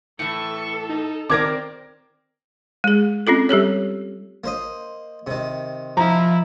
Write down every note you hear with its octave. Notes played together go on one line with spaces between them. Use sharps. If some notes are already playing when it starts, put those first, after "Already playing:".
A2 E3 A4 C#6
D#4
D#3 C4 A#4 D5 D6 G#6 A#6
G#3 G#4
C4 C#4 F4 A4
G3 G4 A4 C#5
A#3 C5 D#5
C3 D#3
F3 E4 A#5